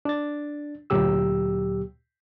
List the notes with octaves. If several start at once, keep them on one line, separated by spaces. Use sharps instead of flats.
D4 A6
D2 A#2 F#3 G4 E6